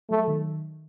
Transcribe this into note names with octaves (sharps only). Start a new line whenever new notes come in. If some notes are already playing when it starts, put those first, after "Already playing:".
F#3 A3
D#3